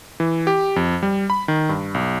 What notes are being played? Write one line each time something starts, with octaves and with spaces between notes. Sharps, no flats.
E3
G4
F2
G3
B5
D#3
G2
B1